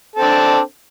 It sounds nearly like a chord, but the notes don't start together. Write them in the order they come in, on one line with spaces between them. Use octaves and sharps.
A4 C4 D4